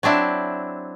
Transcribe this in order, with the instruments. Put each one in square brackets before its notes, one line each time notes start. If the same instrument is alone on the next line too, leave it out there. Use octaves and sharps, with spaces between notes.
[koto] F#3 C4 D4 E4